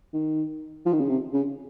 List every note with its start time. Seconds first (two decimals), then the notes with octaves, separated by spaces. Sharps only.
0.13 D#3
0.86 F3
0.93 D#3
1.01 C#3
1.09 C3
1.33 C#3